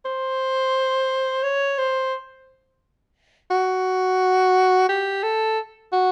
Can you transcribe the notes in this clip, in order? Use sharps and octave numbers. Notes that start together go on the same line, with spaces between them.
C5
C#5
C5
F#4
G4
A4
F#4